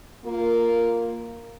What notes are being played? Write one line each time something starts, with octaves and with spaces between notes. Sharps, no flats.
A#3 F4 A#4